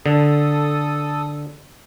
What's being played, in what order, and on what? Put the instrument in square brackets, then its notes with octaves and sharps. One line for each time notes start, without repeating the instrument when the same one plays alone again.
[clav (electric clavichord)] D3 [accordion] A4 D#6